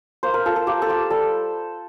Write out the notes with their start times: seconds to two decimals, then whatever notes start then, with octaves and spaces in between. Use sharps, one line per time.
0.23 A#3 C5
0.34 A#4
0.45 F4 A4
0.56 A4
0.67 A#3 G4
0.82 A4
0.89 F4 G4
1.10 G3 A4